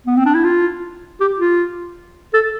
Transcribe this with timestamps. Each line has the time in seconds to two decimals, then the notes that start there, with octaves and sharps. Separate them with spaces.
0.07 B3
0.17 C4
0.26 D4
0.34 E4
0.44 F4
1.20 G4
1.39 F4
2.34 A4